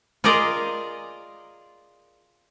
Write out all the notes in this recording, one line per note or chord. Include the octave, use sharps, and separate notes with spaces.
F4 G#4 A#4 D5 D#5 A#5